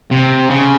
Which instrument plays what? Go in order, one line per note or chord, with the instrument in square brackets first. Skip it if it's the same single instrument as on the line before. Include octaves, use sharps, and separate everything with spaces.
[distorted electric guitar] C3
C#3